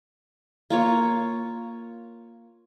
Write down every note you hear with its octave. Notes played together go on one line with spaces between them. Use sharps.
A#3 F4 C#5